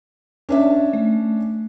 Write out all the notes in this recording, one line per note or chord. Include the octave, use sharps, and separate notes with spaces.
C#4 D4 E5
A3